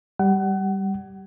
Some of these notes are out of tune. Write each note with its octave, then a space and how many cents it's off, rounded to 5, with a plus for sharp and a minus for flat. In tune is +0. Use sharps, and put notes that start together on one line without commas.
G3 -5 F#5 +30